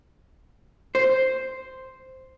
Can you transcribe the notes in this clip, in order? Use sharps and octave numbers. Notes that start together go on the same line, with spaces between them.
C5